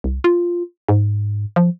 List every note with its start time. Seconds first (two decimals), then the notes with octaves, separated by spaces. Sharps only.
0.04 C2
0.24 F4
0.88 G#2
1.56 F3